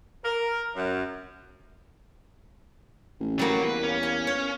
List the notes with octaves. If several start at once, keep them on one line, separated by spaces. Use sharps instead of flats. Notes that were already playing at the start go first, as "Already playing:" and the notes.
A#4
F#2
A1
F#3 G3 A#3 F#4
E2 B4
C#4
G#5
C#5